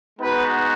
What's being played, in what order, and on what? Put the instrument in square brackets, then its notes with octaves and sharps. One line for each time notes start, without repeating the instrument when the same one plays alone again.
[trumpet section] G#3 B3 D#4 F#4 B4